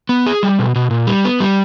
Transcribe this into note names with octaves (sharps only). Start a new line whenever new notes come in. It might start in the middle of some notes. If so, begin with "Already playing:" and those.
B3
G#4
G3
B2
B2
A#2
G3
B3
G3